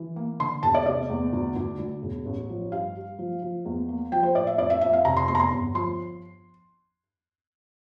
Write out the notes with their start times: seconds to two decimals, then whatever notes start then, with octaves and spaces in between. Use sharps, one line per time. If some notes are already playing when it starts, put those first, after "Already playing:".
Already playing: E3
0.16 A#3
0.40 D3 C6
0.63 E1 A5
0.74 D5
0.86 C3 D5
1.10 E2
1.33 D2
1.56 D2
1.79 D2
2.03 E1
2.25 A1
2.50 F3
2.72 G2 F5
2.95 G3
3.19 F3
3.42 F3
3.65 E2
3.89 A#3
4.12 F3 G5
4.23 C5
4.35 A2 D5
4.47 E5
4.58 F2 D5
4.70 E5
4.81 F2 E5
4.93 F5
5.05 F1 A#5
5.17 C6
5.28 E2 C6
5.35 A#5
5.40 C6
5.51 G1
5.74 F3 C6